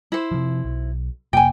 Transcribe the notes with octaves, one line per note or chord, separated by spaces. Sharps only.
E4 C5
C3 F3
B1
F1 C3 A#3 G5 G#5